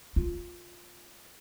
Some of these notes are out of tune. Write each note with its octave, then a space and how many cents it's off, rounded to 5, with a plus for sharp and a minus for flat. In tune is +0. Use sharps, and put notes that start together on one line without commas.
F4 +5